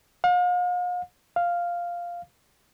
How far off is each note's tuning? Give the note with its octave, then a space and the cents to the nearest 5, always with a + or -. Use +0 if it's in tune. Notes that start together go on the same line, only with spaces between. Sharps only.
F5 +45
F5 +0